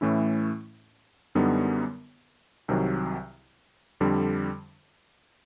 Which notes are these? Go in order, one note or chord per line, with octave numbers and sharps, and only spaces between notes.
A2 E3 A3 C#4 E4
F#2 D3 G3 B3 D#4
C2 C3 D#3 F#3
F2 D3 G3